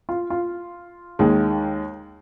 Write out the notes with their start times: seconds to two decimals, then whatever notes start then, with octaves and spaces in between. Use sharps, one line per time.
0.09 F4
0.30 F4
1.19 D#2 D#3 G#3